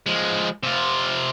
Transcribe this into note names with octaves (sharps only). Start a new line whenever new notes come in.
F3 G#3
C3 F4